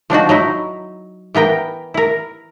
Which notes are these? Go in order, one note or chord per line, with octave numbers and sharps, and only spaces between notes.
F3 D4 D#4 F#4
F#3 D#4 E4
E3 B3 A#4 G5
E4 A#4